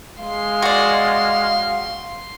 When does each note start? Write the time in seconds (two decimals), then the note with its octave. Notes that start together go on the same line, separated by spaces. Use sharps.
0.20 G#3 F5 C6
0.62 F#4 D5